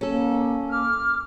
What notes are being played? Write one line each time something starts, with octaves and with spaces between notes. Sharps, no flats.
A#3 C#4 A4
D6 F6